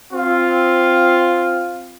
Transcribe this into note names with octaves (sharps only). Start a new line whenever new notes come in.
C4 F4